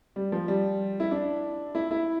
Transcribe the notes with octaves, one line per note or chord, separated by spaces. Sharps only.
G3
F3
G3
E4
D4
E4
E4